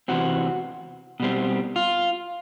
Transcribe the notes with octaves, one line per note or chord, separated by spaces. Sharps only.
E2 C3 E3 C4 F#4
B2 G3 C4
F4